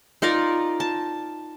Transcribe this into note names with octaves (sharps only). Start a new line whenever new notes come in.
D#4 F4 A#4 D5
A5